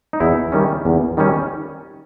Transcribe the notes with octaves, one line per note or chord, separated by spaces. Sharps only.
D#4
E2 E4
D#3 G3 C#4
E2
D#3 G3 C#4